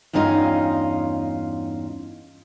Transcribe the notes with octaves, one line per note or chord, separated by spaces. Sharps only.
E2 G2 C#4 D#4 F4